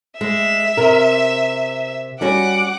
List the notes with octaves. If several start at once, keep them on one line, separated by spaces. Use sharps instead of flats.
G#3 E5
C3 A#4
G3 C#4 F#4 F#5 D6